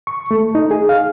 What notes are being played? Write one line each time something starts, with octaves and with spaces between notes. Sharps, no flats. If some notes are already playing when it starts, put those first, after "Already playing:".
C#6
A3
D#4
G#4
F5